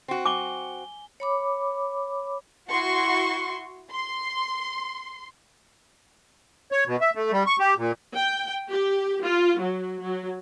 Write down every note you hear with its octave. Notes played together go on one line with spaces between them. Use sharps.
C4 F#4
G#5 D6 G7
C#5 B5 D6
E4 F#4 C6 C#6
C6
C#5
B2
E5
A3
G3
C#6
G4
A#2
G5
G4
F4
F#3
F#3